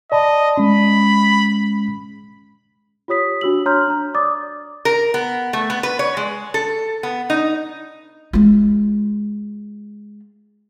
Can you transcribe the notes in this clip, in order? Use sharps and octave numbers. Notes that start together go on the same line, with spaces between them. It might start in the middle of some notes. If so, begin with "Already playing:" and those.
D5 D#5 A5 B5
G#3 C#4 B5
F4 G4 C#5 D#6 B6
D4 F#4 E6 F#7
D4 C#5 A#5 C6 F6 G6
D4 A#5
D5 D6 D#6 A6
A#4
B3
A3
B3
B4
C#5
G#3
A4
B3
D#4
G#3 F4